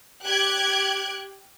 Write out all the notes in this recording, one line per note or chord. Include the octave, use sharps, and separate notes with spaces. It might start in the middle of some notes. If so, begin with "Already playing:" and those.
G4 F#6 G#6 D7